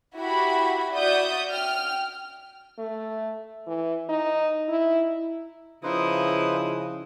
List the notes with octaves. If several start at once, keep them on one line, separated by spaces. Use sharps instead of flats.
E4 F#4 G4 B5
F#4 D5 E5 D#6 G6
G5 F6
A3
E3
D#4
E4
C#3 F3 D#4 E4 B4 C5 D#6